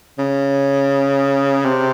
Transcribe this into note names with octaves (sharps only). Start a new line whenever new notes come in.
C#3
C3